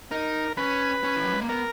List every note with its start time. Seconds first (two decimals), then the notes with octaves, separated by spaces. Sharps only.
0.11 D#4 A#4
0.57 C#4 B4
1.03 C#4
1.16 E3
1.24 F#3
1.33 G#3
1.41 A#3
1.49 B3 A#4